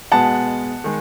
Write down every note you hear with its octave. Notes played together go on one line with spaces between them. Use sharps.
B2 G#3 B3 F#5 A5
D#3 G#3